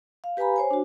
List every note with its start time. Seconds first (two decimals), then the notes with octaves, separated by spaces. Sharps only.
0.24 F5
0.37 G4 B4 F5 G#5 A#5 B5
0.56 C5 C#5 G#5
0.71 D4 F#4